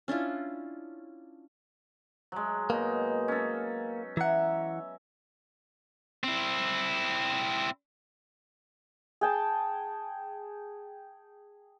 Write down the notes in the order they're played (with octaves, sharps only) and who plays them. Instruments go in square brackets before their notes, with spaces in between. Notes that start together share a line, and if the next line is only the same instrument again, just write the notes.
[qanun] C#4 D4 E4 F4
[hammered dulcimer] F#3 G#3
[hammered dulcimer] B2 D#4 [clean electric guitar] A#3
[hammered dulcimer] C#4 A4
[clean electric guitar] E3 F#5 [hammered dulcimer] E5 A#5
[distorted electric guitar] C4 E4
[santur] G#4 G5 A5